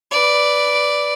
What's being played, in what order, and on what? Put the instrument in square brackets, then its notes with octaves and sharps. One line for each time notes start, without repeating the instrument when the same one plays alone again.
[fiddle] B4 D5